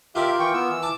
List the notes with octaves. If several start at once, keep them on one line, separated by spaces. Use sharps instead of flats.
F4 G4 A#4 D5 E5
E3 G5 C#6
B3 E6
E3 E6
A5 D6